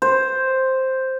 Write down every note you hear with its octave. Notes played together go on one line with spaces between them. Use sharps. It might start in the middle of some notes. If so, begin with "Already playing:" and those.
C5